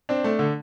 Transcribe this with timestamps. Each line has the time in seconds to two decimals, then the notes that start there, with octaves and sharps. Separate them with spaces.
0.09 C4 D4
0.24 A3
0.39 D3